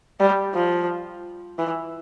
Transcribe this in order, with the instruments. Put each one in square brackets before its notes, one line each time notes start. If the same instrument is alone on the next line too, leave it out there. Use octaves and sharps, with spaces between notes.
[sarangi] G3
F3
E3